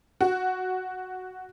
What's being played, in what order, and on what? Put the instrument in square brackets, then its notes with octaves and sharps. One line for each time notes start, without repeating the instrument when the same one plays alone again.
[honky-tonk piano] F#4